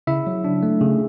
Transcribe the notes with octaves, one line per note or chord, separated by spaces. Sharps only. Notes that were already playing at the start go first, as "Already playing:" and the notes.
C#3 E4 E5
F#3
D4
A3
C#3